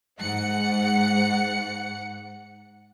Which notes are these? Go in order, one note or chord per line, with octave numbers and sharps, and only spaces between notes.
G#2 F#5 C#7